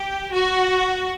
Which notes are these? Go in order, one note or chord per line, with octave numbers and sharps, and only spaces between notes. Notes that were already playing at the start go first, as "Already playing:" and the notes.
Already playing: G4
F#4